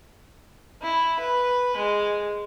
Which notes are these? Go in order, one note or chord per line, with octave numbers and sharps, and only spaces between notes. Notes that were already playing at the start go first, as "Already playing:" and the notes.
E4
B4
G#3